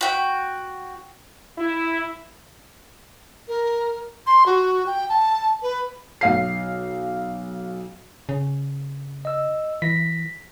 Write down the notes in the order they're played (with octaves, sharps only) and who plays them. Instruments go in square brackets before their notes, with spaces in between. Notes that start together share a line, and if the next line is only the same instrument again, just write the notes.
[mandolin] F#4 G5
[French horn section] E4
[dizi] A#4
C6
F#4
G5
A5
B4
[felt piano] B1 F5 C7
[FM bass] C#3
[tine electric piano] D#5 E6
[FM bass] E3 [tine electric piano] A#6 B6